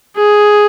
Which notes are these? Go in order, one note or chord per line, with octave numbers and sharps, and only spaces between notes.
G#4